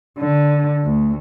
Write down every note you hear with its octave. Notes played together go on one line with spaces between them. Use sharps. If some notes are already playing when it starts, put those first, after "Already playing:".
D3
D2